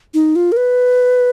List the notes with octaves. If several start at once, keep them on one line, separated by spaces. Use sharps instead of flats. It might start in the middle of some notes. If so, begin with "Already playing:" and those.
D#4
F4
A#4
B4